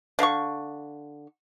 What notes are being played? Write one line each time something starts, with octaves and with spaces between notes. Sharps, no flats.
D3 F5 A#5 C#6